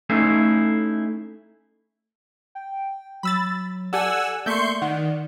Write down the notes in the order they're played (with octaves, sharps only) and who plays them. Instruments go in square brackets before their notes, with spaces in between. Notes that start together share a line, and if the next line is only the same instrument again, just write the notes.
[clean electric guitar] A3 C#4 D#4 E4 F5
[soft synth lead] G5
[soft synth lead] F#3 [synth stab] B5 E6 A6
[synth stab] G4 A4 [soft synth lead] D5 [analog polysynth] F#5 G#5 E6
[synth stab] A3 A#3 E5 [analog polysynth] C6 C#6 G6
[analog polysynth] D#3 [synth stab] F#5